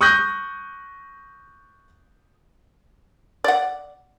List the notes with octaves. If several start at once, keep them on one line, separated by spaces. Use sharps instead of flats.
C#6 D#6 F#6 G6 A#6
D5 F#5